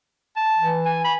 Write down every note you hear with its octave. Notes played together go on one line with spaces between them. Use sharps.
A5
E3
G#5
B5